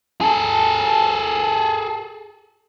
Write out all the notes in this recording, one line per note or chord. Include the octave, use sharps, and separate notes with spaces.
G#4 A4